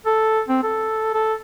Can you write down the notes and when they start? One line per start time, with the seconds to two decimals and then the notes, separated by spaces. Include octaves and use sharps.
0.06 A4
0.49 C4
0.63 A4
1.14 A4